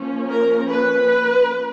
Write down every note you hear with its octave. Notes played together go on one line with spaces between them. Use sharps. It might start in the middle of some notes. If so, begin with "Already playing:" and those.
Already playing: F3 A#3 C#4
A#4
B4